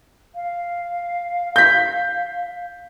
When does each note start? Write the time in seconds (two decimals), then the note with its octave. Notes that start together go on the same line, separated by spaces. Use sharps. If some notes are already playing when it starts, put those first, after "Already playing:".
0.35 F5
1.56 G6 B6